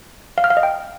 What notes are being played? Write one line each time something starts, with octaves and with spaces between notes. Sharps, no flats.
F5
F6
F5
D#5
G5